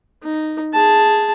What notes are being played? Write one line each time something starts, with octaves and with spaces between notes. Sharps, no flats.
D#4
G#4 A5